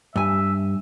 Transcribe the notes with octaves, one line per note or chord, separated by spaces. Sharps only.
G2 E5 G#5